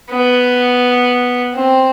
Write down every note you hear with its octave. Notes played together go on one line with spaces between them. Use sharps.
B3
C4